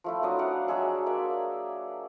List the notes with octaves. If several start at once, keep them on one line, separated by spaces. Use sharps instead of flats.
F3 A3 E4
F#3 D4 C5 D#5
D5 F5 F#5 G#5
F#3 G#3 G#4 E5
A#3 D5 E5